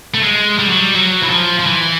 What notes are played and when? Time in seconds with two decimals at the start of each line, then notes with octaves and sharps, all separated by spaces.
0.14 A3
0.23 G#3
0.59 G3
0.68 F#3
0.77 G3
0.94 F#3
1.22 E3
1.30 F3
1.60 F3
1.66 E3